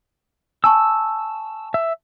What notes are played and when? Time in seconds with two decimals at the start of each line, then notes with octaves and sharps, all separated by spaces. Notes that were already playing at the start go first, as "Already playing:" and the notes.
0.64 G#5 A5 C#6 E6
1.74 E5